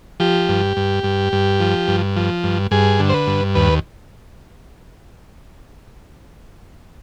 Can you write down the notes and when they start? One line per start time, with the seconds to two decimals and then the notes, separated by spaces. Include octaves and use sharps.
0.20 F3 G4
0.49 G2
0.77 G2
1.04 G2
1.33 G2
1.60 F3
1.88 G2
2.16 F3
2.44 G2
2.71 G2 G#4
3.00 D3
3.09 C5
3.14 B4
3.27 G2
3.55 D#2 B4